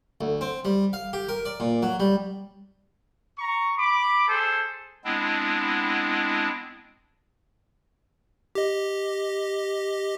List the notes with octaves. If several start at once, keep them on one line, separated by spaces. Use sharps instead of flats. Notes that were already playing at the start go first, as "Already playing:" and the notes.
D2
C4
G3
F5
G4
A#4
D5
A#2
F#3
G3
A#5 C#6
B5 D6
G#4 A4 C5
G#3 B3 C4 D4 E4
G4 D#5